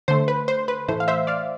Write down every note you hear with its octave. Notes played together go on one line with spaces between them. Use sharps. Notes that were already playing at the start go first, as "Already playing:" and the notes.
D3 A3 C5
B4
C5
B4
A2 E3 A3 C5
F5
C5 E5
D5 F5